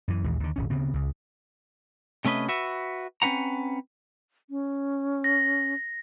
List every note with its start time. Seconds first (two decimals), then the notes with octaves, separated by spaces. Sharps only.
0.08 F#2 E3
0.24 A#1 D#2 E3 G#3
0.40 D#2 D3
0.56 D#1 G#1 C#4
0.70 D2 C#3 B3 C4
0.94 C#2 C#3
2.25 C3 A3 C#4 B4 D#5
2.49 F#4 B4 E5
3.22 C4 C#4 B4 F#5 A#5
4.50 C#4
5.24 A#6